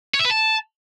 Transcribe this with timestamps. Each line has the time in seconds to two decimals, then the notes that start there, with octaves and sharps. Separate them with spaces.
0.15 C#5
0.20 E5
0.25 B4
0.31 A5